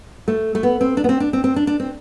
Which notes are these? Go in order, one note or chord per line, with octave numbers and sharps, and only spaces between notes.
A3
A3
B3
C4
D4
B3
C4
D4
C4
C4
D4
D4
C4